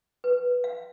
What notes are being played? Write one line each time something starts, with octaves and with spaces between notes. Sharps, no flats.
B4
F5